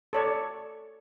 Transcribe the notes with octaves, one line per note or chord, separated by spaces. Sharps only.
A4 C#5 D5